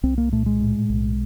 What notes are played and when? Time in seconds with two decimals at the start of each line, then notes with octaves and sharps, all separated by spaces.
0.03 C2 C4
0.18 A#3
0.32 A#2 A3
0.46 G#3
0.61 A2
0.90 B1